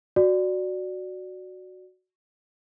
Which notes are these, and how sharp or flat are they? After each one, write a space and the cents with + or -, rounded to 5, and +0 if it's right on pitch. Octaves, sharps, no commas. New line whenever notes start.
F#4 +0 D5 +10